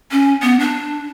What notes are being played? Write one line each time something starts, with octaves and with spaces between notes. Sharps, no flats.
C#4
B3
D4